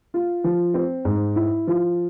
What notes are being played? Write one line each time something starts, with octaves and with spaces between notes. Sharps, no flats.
F4
F3
C4
G#2
E4
F3